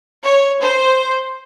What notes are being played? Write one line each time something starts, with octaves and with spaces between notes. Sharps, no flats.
C#5
C5